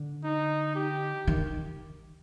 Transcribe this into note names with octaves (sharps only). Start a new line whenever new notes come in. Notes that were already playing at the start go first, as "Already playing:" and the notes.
Already playing: D3
D#4
G4
D#3